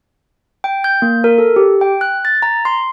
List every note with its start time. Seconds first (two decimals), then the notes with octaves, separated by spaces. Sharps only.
0.64 G5
0.84 G6
1.02 A#3
1.24 A#4
1.38 A4
1.56 G4
1.81 G5
2.01 F#6
2.25 A6
2.42 A#5
2.65 C6